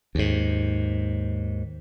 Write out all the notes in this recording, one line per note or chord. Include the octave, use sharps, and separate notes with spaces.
D#2 G#2